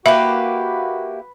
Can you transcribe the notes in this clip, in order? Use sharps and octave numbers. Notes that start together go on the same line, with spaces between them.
A#3 E4 F#4 G4 B4 E5